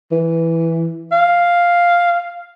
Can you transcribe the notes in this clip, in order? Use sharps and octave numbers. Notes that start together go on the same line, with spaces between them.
E3
F5